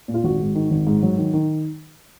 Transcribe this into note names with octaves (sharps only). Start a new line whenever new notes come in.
A#2
F4
G#1 F#4
G#2
D#3
G#1
G#2
F#3
D#3
D#3